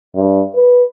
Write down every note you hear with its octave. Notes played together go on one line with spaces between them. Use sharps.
G2
B4